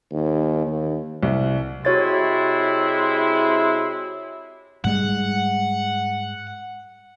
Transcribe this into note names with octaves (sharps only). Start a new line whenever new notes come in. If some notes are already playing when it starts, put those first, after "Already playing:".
D#2
D#2
C2
C3 G#3 E4 F#4 C#5 A6
G#2 G3 G#3 F#5